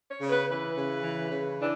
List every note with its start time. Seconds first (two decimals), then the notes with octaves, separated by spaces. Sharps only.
0.11 C#5
0.21 C#3
0.30 B4
0.48 E3 B4
0.76 C#3
1.04 E3
1.31 C#3
1.59 E3 D4